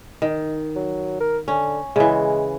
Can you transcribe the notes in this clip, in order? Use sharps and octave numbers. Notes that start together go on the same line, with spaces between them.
D#3
F#3
A#4
D3 C#4
C#3 E3 G#3